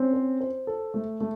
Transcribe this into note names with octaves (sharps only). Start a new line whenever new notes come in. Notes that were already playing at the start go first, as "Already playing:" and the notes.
Already playing: C4 C#4
C5
C5
A4
A3
A3